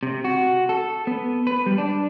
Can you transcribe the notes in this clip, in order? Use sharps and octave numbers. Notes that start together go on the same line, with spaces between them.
C3
F#4
A4
B3
B4
G3
D4